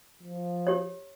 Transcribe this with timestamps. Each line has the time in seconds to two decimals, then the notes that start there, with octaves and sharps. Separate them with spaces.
0.23 F3
0.67 G4 C#5